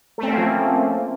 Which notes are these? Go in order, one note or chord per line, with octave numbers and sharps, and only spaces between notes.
F3 A3 A#3 C4 C#4